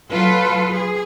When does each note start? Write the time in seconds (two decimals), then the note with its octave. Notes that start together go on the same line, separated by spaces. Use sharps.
0.10 F#3 F4 A4 B4
0.73 G#4